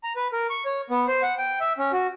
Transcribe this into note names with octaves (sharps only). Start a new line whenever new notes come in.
A#5
B4
A#4
C#6
C#5
B3
C5
F#5
G5
E5
C#4
F#4